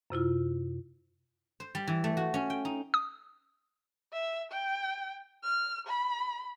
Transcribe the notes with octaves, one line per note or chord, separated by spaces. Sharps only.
F#2 C3 E4 F4
C5
G3
E3
A3
F#4
C#4
G5
D#4
D#6
E5
G5
F6
B5